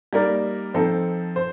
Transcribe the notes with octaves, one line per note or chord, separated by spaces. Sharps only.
G3 A#3 D#4 A#4 D5
F3 C4 D#4 A4
C5